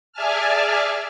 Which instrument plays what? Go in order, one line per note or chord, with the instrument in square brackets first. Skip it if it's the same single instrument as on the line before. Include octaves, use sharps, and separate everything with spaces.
[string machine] G#4 D5 E5 G#5 A5 F6